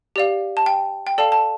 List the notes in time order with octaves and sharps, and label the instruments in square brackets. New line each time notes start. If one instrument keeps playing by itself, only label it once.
[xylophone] G4 D5 F5
A5
G5
G5
A4 D5 F5 A5
A5